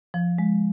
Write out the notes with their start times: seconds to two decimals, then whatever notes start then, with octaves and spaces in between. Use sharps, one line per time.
0.14 F3
0.38 G#3